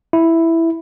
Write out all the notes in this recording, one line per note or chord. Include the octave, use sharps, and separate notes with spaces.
E4